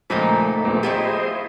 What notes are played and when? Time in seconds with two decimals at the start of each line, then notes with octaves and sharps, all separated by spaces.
0.10 C#2 A#2 F3 A3 C4 D#4 B5
0.65 A#1 A#2 F3 A3 B3
0.83 A3 E4 F4 G4 G#4 C5 D#5